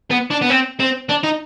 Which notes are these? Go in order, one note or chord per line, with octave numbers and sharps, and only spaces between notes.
B3
D4
B3
C4
C4
D4
D#4